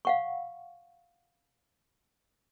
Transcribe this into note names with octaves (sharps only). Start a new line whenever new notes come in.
F5 F#5 C#6